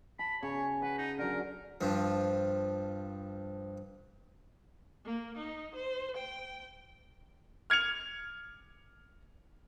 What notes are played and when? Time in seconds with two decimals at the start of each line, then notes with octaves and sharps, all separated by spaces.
0.19 A5 B5
0.43 C#3 C#5
0.82 B4 F#5
0.98 D#4
1.19 D3 F#3 A#4
1.81 G2 F3
5.05 A#3
5.38 D#4
5.76 C5
6.18 G5
7.70 F6 G#6 C#7 F7